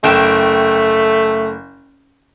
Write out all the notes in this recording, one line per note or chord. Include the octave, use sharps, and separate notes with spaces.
F#1 A3 G5 E7